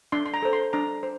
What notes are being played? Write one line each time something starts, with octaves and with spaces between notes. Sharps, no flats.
D4 C6
C6
A#5
A4 C5
C6
D4 A#5
C5